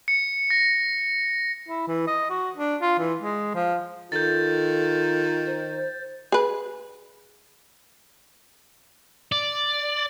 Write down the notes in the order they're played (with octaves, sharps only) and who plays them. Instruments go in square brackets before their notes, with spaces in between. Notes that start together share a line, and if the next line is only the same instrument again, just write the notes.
[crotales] C#7
A#6
[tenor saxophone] E4
E3
D#5
F#4
D4
F4
E3
G#3
F3
[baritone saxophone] D#3 [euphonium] F4 [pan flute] A4 [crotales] G6 A6
[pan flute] C5
[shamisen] G#4 B4
[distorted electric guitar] D5